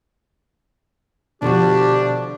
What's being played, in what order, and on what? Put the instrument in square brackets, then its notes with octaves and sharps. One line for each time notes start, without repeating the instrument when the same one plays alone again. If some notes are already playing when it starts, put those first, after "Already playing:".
[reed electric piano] B2 C#6 [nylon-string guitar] D3 F3 F#4 [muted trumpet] D4 [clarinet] G4